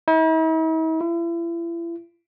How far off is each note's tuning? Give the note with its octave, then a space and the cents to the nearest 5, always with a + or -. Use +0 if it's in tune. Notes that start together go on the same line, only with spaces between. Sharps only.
E4 -45
E4 +40